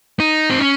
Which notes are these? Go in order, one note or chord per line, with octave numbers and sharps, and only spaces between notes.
D#4
C4
C#4